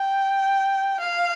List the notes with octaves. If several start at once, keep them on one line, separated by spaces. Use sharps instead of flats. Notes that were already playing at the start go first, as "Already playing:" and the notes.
Already playing: G5
F5